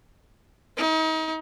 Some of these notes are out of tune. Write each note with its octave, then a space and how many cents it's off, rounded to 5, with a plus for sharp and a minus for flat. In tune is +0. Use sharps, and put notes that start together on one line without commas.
D#4 +35